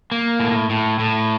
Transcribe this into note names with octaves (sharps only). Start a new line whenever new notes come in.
A#3
A2
A2
A2